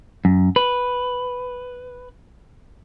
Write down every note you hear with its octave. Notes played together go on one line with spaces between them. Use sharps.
F#2
B4